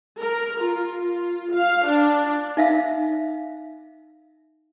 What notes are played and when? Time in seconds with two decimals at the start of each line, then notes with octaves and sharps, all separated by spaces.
0.20 A#4
0.61 F4
0.98 F4
1.53 F5
1.86 D4
2.57 D#4 E5 F5